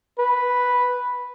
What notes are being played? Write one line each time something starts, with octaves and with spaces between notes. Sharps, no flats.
B4